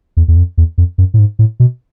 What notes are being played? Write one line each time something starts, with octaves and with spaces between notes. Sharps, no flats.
E2
E2
F2
E2
F2
F#2
A2
G#2
A2
B2